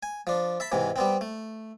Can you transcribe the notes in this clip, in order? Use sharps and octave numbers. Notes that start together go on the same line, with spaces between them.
G#5
F3 D4
E5 A5 B5
G#2 C3 E3
G3 B3 C4
A3